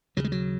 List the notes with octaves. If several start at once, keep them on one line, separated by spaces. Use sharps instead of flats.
D#2 C#3 F#3
G#3
F#3